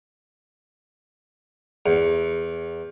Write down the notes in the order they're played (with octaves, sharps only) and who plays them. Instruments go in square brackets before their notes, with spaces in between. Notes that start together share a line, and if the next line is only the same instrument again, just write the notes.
[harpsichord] E2